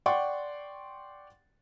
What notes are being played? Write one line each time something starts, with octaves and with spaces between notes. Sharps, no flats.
D5 F#5 G5 C6 C#6